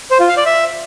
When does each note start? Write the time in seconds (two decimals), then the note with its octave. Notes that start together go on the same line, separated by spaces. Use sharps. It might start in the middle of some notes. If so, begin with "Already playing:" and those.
0.11 C5
0.20 F4
0.28 F5
0.37 D5
0.46 E5